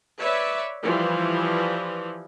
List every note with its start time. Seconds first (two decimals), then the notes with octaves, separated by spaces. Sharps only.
0.19 B4 C#5 D5 E5
0.82 E3 F3 G3